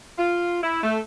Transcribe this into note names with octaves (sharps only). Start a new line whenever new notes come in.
F4
E4
A3